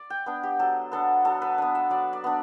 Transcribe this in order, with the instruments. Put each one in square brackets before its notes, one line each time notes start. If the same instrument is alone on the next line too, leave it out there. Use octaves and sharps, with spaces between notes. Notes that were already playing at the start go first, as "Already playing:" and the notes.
Already playing: [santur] D5
G5
B3 D4
G4
F#3 A4
B3 D4 A4
F#3 A4
B4
B3 D4
E5
F#3 D5
D5
B3 D4